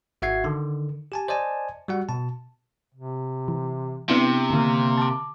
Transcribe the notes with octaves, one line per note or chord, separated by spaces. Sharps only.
G#1 F#4 E5 F#5 G#6 C7
D3 D#3
G4 G#5 A5
C5 D5 D#5 G#5 A5
G3 F#4 F#5
B2 A5
C3
E3
C3 B3 D4 E4
D3 D#3 A#3
A5 D6